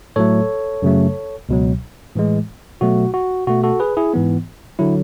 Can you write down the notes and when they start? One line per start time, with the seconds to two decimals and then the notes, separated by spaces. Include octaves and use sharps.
0.16 A2 F#3 A3 A4 C#5
0.82 F#2 C#3 F#3 A3
1.49 C#2 B2 F#3
2.15 A2 E3 G#3
2.81 B2 F#3 A3 F#4
3.14 F#4
3.47 B2 A3 F#4
3.64 F#4 A4
3.80 G#4 B4
3.97 E4 G#4
4.14 G#2 E3 B3
4.79 D3 F#3 E4